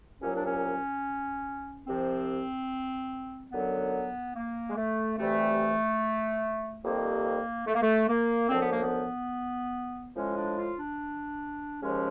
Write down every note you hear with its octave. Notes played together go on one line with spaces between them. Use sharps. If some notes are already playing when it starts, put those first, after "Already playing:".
C2 A#2 F#3 C#4
D4
C#4
C2 C3 F3 C4
F#2 D3 F#3 B3
A#3
G#3
A3
D2 C3 E3 G3 A3
F2 C3 D#3 G3 A#3
A3
A#3
A3
A#3
F#2 D3 F3 C4
B3
A#3
B3
A2 F3 G#3 C#4
D4
F4
D4
D#2 C#3 F3 G#3 C#4